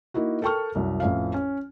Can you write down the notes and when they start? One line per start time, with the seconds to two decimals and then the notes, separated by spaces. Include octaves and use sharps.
0.14 A#3 D#4 E4 F#4
0.42 A4 A#4 G5 A5 C#6 F6
0.75 C2 F#2
1.00 A1 F2 C#4 E5 F5
1.34 C#4